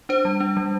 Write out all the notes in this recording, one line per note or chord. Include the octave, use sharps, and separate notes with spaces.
D4 C5
G3
D4
G3